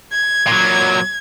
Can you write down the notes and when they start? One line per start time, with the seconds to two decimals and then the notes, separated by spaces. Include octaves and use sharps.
0.13 G#6
0.47 A#2 F#3